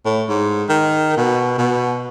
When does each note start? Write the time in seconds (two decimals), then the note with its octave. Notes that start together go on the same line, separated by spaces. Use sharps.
0.05 A2
0.28 G#2
0.69 D#3
1.17 B2
1.58 B2